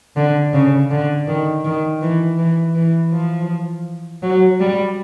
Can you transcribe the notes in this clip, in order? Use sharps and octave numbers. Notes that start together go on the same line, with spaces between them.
D3
C#3
D3
D#3
D#3
E3
E3
E3
F3
F#3
G3